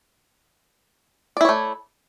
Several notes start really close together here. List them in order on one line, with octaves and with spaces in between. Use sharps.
D5 E4 C#5 A3